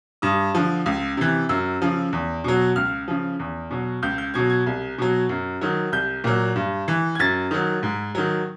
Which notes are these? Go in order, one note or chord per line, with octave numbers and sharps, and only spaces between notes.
G2 D#6
D3 F3
C#2
C3 E3
F#2 E6
C#3 F3
E2
B2 F#3
C#2 F6
C#3 F3
E2
B2 F#3
C#2 G6
G6
B2 F#3 G#6
G#6
C2
B2 F#3
F#2
D#3 F#3
C2 G6
A#2 F#3
G2
E3
G#6
F#2 A6
D#3 F#3
G#2
D#3 F#3